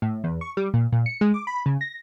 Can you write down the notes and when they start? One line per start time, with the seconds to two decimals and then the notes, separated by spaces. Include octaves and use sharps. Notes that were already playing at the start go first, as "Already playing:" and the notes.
0.02 A2
0.24 E2
0.41 C#6
0.57 G3
0.74 A#2
0.92 A#2
1.06 C#7
1.21 G#3
1.34 D6
1.47 B5
1.66 C#3
1.81 A#6